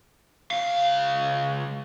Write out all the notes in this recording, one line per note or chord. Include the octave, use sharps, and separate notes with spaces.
C#2 F5